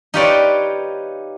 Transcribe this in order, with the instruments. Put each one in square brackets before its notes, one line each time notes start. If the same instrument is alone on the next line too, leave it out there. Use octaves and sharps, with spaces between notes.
[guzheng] D#4 F4 G4 B4 C#5 D5